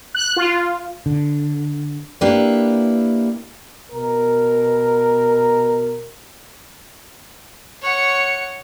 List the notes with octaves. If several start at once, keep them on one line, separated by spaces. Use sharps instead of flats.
F#6
F4
D3
A#3 D4 E4 G4 B4
B2 A#4
C#5 F#5